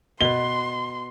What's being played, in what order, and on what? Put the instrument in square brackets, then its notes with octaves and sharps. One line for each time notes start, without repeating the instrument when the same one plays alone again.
[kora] B2 B4 [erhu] C6 [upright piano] G7